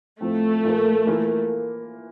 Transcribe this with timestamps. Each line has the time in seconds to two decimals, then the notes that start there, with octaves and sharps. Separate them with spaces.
0.20 A2 F3 A3 C4
0.64 A#2 F3 A#3
1.07 E3 A#3 F4